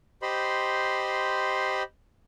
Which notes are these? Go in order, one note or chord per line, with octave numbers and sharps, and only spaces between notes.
G4 C5 D#5 B5 C6